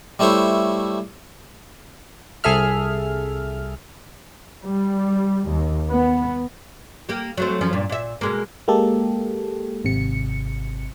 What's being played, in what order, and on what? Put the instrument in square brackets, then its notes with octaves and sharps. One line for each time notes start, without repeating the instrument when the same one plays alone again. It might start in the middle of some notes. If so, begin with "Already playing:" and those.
[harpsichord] G3 A3 E4 C5 C#5
[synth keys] C2 G#4 A4 E5 F6
[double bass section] G3
D#2
B3
[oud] A#3 G4
F#3 A3 C4
F#2 F3 C#4
G2 A#2
A#2 E5
B2 G#3 A#3
[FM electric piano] G#3 A#3 G4 A4
G#1 C3 C#7